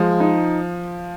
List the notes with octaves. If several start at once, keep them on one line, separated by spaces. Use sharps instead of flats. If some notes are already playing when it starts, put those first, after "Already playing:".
Already playing: F3 G#3
D#4